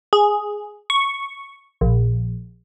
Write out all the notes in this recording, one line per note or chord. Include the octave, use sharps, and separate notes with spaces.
G#4
C#6
A#1